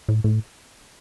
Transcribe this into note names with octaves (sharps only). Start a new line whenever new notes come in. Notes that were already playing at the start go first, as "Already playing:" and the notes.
A2
A2